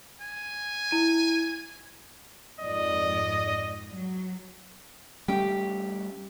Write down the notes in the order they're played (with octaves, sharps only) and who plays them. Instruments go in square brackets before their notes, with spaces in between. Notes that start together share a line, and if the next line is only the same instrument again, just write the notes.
[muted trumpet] G#5
[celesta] E4 D#7
[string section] F2 G#2 D5 [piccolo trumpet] D#5
[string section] F#3
[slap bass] G3 A3 C#4 [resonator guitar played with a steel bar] G4